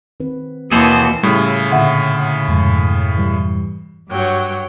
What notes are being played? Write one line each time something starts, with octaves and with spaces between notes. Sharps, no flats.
D#3 C4 B4
D#2 B2 E3 A#3 G#4 A4 C5
A2 C#3 G3
E6
A#2 D3 A3 E5 F#5 C6
F2 G#2 B2
E3 G3
G2 F#3 C#5 G5